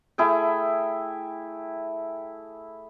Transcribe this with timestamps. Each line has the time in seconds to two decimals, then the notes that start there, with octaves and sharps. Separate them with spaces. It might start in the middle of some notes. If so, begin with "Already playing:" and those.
0.18 A3 E4 G#4 G5